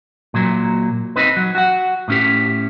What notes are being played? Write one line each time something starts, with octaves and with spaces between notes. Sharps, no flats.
A#2 F#3
C4 D#4 B4
F#3
F#4 F#5
A2 C#4 G4